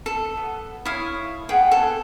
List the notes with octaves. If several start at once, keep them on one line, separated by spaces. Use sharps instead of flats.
A4
B3
E4 C#5 F5 D#6 F6
B3 G#4 F#5 G5
A4